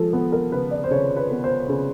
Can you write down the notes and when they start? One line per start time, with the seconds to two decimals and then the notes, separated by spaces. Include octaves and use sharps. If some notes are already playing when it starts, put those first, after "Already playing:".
Already playing: F3 G#3 A4
0.13 B3 A4
0.32 A#4
0.52 C#3 B4
0.71 D5
0.84 C5
0.91 C#3 C#5
1.17 B4
1.31 B3
1.44 C5
1.69 C#3